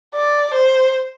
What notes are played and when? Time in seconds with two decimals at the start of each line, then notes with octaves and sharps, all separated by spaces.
0.15 D5
0.54 C5